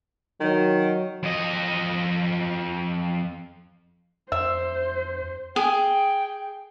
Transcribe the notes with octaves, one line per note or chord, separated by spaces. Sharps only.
D#3 F#3
F2 D#5
F2 C5 E5
G#4 G5